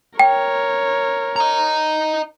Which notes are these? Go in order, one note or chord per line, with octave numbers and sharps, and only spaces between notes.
A#4 C#5 G5
D#5 A#5